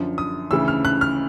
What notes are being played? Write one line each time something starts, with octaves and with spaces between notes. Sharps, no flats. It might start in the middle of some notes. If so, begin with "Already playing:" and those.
Already playing: F#2 D3 F3
D#6
D2 C#3 E3 E6
F6
F#6
F6